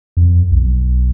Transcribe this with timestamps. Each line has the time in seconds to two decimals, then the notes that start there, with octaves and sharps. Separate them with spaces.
0.17 F2
0.51 B1